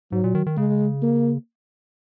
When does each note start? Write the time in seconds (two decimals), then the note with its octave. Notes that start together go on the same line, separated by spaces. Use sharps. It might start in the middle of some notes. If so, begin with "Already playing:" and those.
0.12 G#2 F#3
0.24 A#2
0.35 D#3
0.46 D#3
0.57 C#3 G#3
1.02 A#3